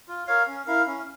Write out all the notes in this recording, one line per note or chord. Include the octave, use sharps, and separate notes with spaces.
F4
A#4 C#5 F5
C#4
E4 A#4 F5
C#4